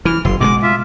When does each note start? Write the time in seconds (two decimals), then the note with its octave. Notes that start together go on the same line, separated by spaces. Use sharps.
0.05 E3 F6
0.25 F#1 C6
0.40 B2 G3 G#3 D6
0.63 F4 E5